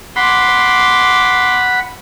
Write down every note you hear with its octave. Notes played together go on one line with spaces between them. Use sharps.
F#5 B5 C6 D6